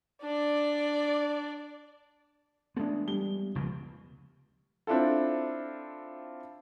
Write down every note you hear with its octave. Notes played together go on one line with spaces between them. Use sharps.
D4 D5
G#3 A3 B3 D4
G3 G7
F1 C#2 B2
C4 D4 E4 F4 A4